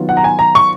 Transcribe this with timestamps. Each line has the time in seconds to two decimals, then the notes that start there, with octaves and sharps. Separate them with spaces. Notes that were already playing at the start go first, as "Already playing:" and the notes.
Already playing: D#3 F#3 B3 F4
0.09 F#5
0.17 A#5
0.24 G#5
0.39 A#5
0.55 C#6